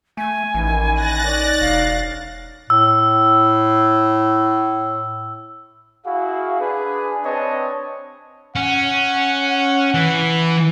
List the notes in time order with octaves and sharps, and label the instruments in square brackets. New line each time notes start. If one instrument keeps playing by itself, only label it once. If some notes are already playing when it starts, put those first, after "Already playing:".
[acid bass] A3 [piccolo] G#5
[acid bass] A1 [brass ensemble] D#3 E3
[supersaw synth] F#6 A6 A#6
[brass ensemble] D#4 C#5 D5
[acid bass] E1 [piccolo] F5
[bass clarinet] A2 [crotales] E6
[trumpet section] E4 F#4 G#4 F5
D4 G#4 B4
C4 D4 B4 C#5 D#5 A5
[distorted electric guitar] C#4 [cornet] F#5
[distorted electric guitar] E3